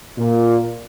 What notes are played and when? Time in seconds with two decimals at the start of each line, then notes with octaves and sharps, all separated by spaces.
0.18 A#2